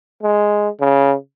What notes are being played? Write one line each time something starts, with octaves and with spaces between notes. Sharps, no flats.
G#3
C#3